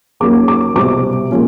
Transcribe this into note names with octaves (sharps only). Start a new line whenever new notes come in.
D#2 C#3 F#3 A#3 D6
D6
C2 B2 G3 C4 D6
A#2 F3 G#3 C#4